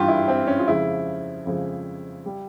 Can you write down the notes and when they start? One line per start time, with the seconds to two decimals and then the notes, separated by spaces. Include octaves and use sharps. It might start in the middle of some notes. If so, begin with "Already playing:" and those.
Already playing: G2 E3 G3 F4 G4
0.08 E4
0.28 C4
0.47 C#4
0.59 F4
0.67 F2 C#3 F3 G#3 E4
1.46 F2 C#3 F3 G#3
2.26 G3